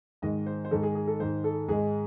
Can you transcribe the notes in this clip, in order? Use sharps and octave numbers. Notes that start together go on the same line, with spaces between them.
G#2 D#3 G#3 D#5
C5
C5
G#2 D#3 G#3 A4
G#4
G#4
A4
G#2 D#3 G#3 C5
A4
G#2 D#3 G#3 G#4